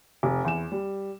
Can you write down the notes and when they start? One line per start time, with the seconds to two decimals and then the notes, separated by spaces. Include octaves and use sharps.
0.23 F1
0.45 E2 E7
0.72 G3